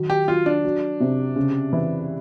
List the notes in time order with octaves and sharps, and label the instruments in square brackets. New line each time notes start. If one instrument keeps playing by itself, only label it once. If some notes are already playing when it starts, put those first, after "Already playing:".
Already playing: [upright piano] D#3 F#3
[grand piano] G4
[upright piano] F#3 [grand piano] F4
[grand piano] D4
[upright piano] F#3
C3
C#3
E3